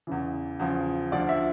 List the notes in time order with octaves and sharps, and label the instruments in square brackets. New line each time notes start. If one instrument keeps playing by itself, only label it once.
[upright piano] E2 C#3 E3
E2 C#3 F3
D2 D3 F3 D5
E5